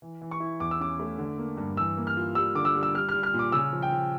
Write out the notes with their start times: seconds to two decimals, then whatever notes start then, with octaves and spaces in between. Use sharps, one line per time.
0.02 E3
0.21 E3
0.31 C#6
0.40 E4
0.60 E2 D6
0.71 E6
0.80 C#4 D6
0.99 A3
1.18 D3
1.38 A#3
1.57 G2
1.77 E3 E6
1.97 A#3
2.07 F6
2.17 F4
2.35 G3 E6
2.55 D3 D6
2.65 E6
2.75 G3
2.83 E6
2.94 G3 F6
3.09 F6
3.14 G3
3.23 F6
3.34 A#2
3.39 D6
3.52 C#3 E6
3.73 F3
3.82 G5
3.92 F3